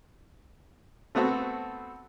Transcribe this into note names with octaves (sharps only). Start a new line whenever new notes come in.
A3 B3 C4 F#4 A4